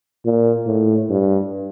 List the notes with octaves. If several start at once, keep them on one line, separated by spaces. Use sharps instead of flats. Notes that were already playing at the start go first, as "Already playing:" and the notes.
A#2
A2
G2